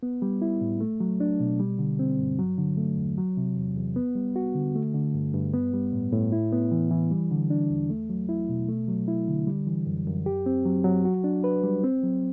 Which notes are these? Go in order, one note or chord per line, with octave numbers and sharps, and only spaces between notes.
B3
G3
E4
A2
A3
F#3
D4
B2
G3
D3
C4
G2
F#3
D3
A3
E2
F#3
C3
E2
E2
B3
G3
F#4
D3
A3
D3
G2
G2
B3
G3
A2
A2
E4
B3
E3
E3
G3
D3
D4
E2
A3
F#3
E4
B2
A3
F#3
E4
D3
G3
E3
F#2
F#2
G4
C4
F#3
F#3
F#4
D4
B4
G3
C4
F#3